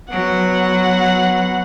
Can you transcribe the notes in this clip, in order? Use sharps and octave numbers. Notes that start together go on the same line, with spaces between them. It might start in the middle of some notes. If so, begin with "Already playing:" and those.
F#3 B3 F#5